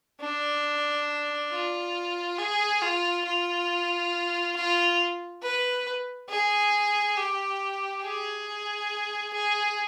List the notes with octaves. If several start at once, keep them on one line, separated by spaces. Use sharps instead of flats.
D4
F4
G#4
F4
F4
F4
B4
G#4
G4
G#4
G#4